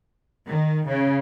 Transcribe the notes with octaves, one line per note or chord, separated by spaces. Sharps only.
D#3
C#3